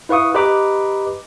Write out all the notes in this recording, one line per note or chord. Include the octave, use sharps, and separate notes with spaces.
E4 B4 F5 C#6 D#6
G4 B4 D#5 A#5 B5 D6